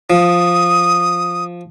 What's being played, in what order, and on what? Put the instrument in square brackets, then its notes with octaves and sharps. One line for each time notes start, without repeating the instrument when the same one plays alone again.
[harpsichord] F3 [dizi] D#6